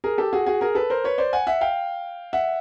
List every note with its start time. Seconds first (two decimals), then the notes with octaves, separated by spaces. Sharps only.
0.04 G#4 A#4
0.18 G4 A4
0.33 F#4 G#4
0.46 F#4 G#4
0.61 G#4 A#4
0.75 A4 B4
0.90 A#4 C5
1.04 B4 C#5
1.18 C5 D5
1.33 F#5 G#5
1.47 E5 F#5
1.61 F5 G5
2.33 E5 F#5